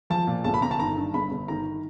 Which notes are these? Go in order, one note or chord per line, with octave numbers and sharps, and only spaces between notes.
F3 A5
A#2
G1 A5
B5
G1 A#5
A5
D#3 A#5
G2
G1 B5
G1
D#3 A#5